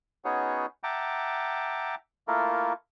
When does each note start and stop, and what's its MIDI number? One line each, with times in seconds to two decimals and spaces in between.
0.25 0.66 59
0.25 0.66 61
0.25 0.66 63
0.25 0.66 66
0.25 0.66 68
0.25 0.66 73
0.83 1.95 76
0.83 1.95 78
0.83 1.95 79
0.83 1.95 81
0.83 1.95 82
0.83 1.95 86
2.28 2.73 57
2.28 2.73 58
2.28 2.73 64
2.28 2.73 65
2.28 2.73 69
2.28 2.73 70